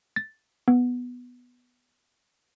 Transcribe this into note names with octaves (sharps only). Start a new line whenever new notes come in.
A6
B3